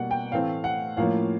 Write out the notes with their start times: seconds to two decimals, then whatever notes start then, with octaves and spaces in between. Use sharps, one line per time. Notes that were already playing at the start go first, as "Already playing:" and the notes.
Already playing: B2 G3 A#3 F#5
0.11 G5
0.32 A2 E3 A3 C4 F5
0.64 F#5
0.97 A2 F3 A#3 C#4 F5